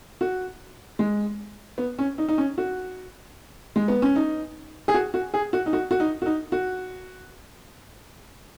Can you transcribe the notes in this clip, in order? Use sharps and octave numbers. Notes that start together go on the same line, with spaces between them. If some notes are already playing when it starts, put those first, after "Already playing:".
F#4
G#3
B3
C#4
D#4
D#4
C#4
F#4
G#3
B3
C#4
D#4
G#4
F#4
F#4
G#4
F#4
D#4
F#4
F#4
D#4
F#4
D#4
F#4